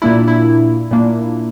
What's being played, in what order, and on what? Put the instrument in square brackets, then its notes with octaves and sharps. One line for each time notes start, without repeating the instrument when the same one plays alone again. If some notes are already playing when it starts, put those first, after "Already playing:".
[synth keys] A#2 A#3 D4 E4
E4
A#2 A#3 D4